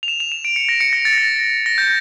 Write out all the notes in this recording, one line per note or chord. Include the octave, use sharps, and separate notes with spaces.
F7
E7
F7
E7
D7
C#7
A#6
C#7
A#6
A6
A#6
A#6
G6